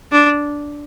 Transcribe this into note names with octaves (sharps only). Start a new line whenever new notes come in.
D4